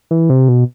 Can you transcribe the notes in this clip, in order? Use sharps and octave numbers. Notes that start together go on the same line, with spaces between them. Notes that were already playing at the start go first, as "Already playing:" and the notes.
E3
C3
B2